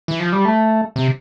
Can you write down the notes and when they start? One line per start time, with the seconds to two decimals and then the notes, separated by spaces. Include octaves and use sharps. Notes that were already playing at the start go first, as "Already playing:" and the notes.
0.08 E3
0.20 F3
0.32 G3
0.45 A3
0.96 C3